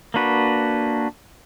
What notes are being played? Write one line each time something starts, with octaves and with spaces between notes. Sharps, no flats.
A#3 D4 F#4 B4